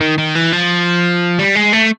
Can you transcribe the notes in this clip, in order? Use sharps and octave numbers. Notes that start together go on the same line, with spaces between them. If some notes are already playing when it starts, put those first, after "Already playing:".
D#3
D#3
E3
F3
G3
G#3
A3